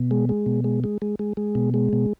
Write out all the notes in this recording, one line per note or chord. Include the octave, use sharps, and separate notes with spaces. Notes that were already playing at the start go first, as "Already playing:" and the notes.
Already playing: B2
G#3
G#3
B2
G#3
G#3
G#3
G#3
G#3
B2
G#3
B2